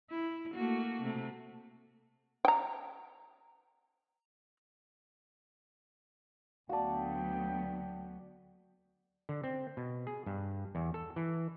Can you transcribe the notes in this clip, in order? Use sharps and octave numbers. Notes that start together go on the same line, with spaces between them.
E4
A3 A#3 F#4
C3 A3
G5 A#5
D2 F#3 B3 F#4 D5 F5 G5 A5
D3
C4
B2
G#4
G2
E2
A4
E3